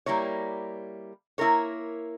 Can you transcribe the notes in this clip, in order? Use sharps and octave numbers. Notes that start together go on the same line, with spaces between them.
G3 A#3 E4 A#4 C#5
A#3 E4 A#4 C#5